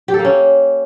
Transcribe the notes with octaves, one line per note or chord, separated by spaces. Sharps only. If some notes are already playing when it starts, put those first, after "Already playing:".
G4
A4
A#3
C#4